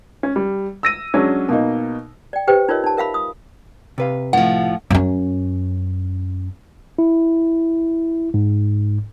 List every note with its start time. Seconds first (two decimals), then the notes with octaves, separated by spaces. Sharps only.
0.23 C#4
0.36 G3
0.83 E6 A#6 D#7
1.14 F#3 G#3 C#4 D4
1.49 B2 A#3 D#4
2.33 D5 G5
2.47 G4 B4 C5 G5
2.69 D#4 F4 A#4 C#5 D#5
2.84 D#4 A5
2.97 A#4 E5 F5 B5
3.14 D#6
3.98 C3 B4 F5
4.33 A2 F3 F#5
4.90 F#2 C#4
6.99 E4
8.34 G#2